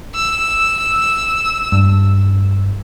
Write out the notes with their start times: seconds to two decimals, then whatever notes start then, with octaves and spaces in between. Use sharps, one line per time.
0.15 E6
1.72 G2